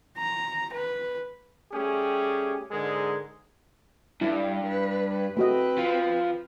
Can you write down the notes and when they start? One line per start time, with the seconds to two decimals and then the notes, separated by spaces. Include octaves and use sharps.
0.18 A#5
0.74 B4
1.72 G3 A3 C#4 G4 G#4
2.71 G#2 D3 G#3 G#4 A#4
4.22 G2 G3 E4
4.63 B4
5.37 A3 C4 F#4 B4 D#5
5.78 F3